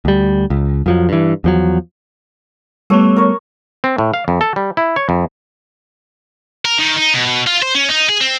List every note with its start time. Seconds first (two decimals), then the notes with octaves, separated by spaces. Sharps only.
0.05 D2 G3
0.50 C#2
0.86 F2 F3 F#3
1.09 G2 E3
1.44 E2 F3 F#3
2.90 G3 A3 B3 A4 C#5
3.16 A#4 C#5
3.84 C4
3.98 A2
4.14 F5
4.28 F2
4.41 A4
4.56 G3
4.77 E4
4.96 C#5
5.09 F2
6.65 A#4
6.79 D#3
6.97 D#4
7.14 B2
7.47 F4
7.62 C5
7.75 C#4
7.89 D#4
8.09 G#4
8.21 C4